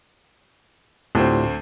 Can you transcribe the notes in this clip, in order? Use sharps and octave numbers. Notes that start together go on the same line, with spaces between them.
D2 A2 C4 F4 G4